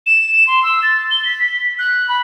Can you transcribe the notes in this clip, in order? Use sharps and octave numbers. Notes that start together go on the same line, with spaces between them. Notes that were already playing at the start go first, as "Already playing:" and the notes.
E7
C6
E6
A6
G7
B6
F#6
B5